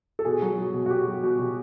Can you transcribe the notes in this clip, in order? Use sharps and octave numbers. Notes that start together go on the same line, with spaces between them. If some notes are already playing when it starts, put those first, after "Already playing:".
A4
B2 G#4
F#3
F#3
B2
F#4
B2 G4
F#3
B2
B2